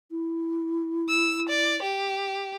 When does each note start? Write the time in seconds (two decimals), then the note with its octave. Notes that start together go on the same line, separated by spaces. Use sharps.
0.11 E4
1.09 E6
1.49 D5
1.82 G4